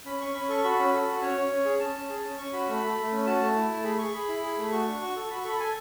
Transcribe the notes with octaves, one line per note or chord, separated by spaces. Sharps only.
C#4 B5
C#4 C#6
C#4 B5
A4 C#6
F#4 B5
C#4
A4
F#4
C#4 C#5
C#4
C#4
G#4
C#4 A5
C#4
G#4
C#4
C#4 C#6
F#4 B5
A3 B5
A3
A3
C#4
F#4 A5
A3
E4
A3
G#4 B5
G#4 C#6
G#4 B5
E4
G#4
A3
F#4 C#6
D4
F#4
A4
F#4 B5
C#6
A4 B5
A4 G#5